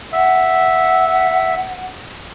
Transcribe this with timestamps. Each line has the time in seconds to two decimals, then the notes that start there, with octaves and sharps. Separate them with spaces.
0.12 E5 F#5